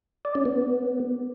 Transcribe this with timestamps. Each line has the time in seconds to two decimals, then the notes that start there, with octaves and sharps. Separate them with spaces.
0.25 D5
0.35 C#4
0.45 B3